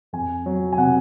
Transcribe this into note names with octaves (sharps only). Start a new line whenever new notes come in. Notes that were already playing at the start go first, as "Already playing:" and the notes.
F2 G#5
F#3
G#5
C3 F#5